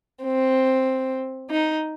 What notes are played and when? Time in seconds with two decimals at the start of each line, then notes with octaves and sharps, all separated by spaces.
0.23 C4
1.51 D#4